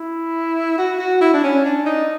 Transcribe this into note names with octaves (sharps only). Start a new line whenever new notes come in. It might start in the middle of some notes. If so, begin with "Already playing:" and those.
Already playing: E4
F#4
F#4
E4
D4
C#4
D4
D#4